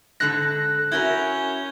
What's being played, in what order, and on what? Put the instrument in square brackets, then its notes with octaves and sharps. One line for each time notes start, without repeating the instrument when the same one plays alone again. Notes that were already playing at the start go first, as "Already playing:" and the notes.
[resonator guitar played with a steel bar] G#2 D3 A4 [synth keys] F#6 A#6
[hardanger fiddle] C#4 [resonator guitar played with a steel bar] E4 F#4 A#4 [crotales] G6 G#6 G7